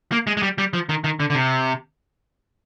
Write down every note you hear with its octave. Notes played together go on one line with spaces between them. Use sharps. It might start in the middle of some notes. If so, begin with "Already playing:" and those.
A#3
G#3
G#3
G3
G3
F3
D#3
D#3
D3
D3
C3